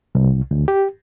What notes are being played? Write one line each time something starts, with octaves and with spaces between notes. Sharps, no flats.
C2
D2
G4